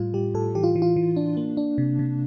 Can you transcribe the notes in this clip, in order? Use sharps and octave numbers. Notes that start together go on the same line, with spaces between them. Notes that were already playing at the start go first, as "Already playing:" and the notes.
Already playing: A2 G3 F4
G3 G4
A2 A4
E3 G4
F4
E3
F4
E3
D4
A#3
D4
C3
C3